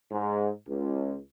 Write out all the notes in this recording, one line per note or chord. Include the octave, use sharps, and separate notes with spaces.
G#2
C#2